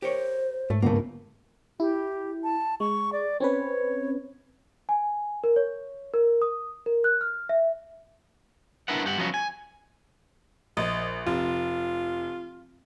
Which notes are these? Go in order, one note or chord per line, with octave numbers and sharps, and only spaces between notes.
G4 A#4 C5 C#5
G#2 A3
G1 C#2 A3 A#3 A#4
E4 G4
A5
G#3 C#6
D5
C4 C#4 B4 C#5
G#5
A#4
C#5
A#4
D#6
A#4
F#6
F6
E5
D4 E4 A#4 B4 F#5
G2 G4 F#5
F3 F#3 B3 C#4 F4 F#4
G#5
A#1 D#5
F1 F4